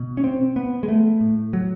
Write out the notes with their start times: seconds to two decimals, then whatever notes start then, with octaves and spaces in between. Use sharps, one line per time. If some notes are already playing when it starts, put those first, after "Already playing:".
Already playing: B2
0.17 C#4
0.24 C4
0.56 B3
0.83 G#3
0.88 A3
1.21 A2
1.53 F#3